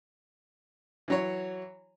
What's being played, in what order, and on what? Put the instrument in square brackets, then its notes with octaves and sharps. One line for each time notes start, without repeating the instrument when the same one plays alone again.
[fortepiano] E3 F#3 C#5